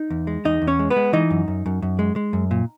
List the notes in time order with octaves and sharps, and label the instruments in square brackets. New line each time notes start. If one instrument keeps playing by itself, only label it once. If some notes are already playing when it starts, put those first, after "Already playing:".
Already playing: [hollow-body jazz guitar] D#4
E2
G#3
E2 D#4 D#5
E2
C#4 C#5
G#3
B3 B4
G#3
E3 D#4 D#5
F#2
F#2
F#2
F#2
G#3
G#3
F#2
A#2